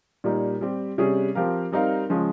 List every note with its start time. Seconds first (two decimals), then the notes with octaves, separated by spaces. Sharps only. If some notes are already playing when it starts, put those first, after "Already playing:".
0.24 A#2 G3 A#3 D#4
0.61 G3 C4 G4
0.98 C3 G3 C#4 G#4
1.35 F3 C4 G4 A#4 F5
1.72 G3 C4 D#4 A#4 F5
2.09 C#3 F3 G#3 C#4